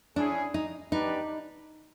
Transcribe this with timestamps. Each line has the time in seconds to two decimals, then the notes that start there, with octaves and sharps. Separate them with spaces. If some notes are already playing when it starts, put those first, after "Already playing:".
0.15 C#4 D4 E4 G#4
0.54 D#4
0.92 B3 D4 D#4 G4 B4 D5